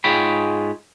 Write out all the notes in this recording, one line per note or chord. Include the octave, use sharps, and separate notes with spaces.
G#2 G#3 F4 C#5 G5 B5